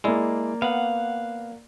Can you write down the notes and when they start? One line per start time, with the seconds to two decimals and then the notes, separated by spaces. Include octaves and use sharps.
0.04 G#3 A#3 E4 D5
0.62 B3 F5 F#5